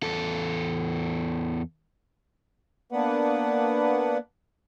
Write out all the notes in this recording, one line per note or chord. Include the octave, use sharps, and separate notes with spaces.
E2 A4
A#3 B3 D4 B4 F#5